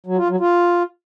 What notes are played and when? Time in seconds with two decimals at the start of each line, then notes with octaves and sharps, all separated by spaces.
0.06 F#3
0.18 F4
0.29 F#3
0.40 F4